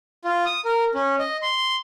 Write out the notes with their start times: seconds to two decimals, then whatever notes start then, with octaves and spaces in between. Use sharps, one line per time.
0.25 F4
0.46 D#6
0.65 A#4
0.95 C#4
1.19 D#5
1.42 C6